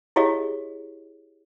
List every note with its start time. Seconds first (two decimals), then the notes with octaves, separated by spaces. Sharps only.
0.16 E4 G4 G#4 C#5 D#5 F5